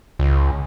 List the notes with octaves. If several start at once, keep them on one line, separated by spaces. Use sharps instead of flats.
C#2